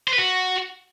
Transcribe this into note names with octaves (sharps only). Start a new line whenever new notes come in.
C5
B4
F#4